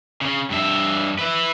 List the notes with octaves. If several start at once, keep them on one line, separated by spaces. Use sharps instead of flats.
C#3
G2 E5
B4 E5